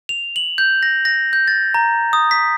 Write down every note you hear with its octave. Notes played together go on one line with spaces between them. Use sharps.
F7
F#7
G6
A#6
A#6
G6
A6
A#5
D#6
B6